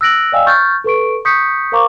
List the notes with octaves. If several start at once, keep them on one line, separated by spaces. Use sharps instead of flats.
E6 F#6 A#6 D7 F#7
D5 D#5 F5 G5 G#5 E6
C#6 F6 G6 A6
A4 B4 C#6 D7
C#6 D#6 G6 B6 C#7
A#4 C5 F5 A#5 C#6 D6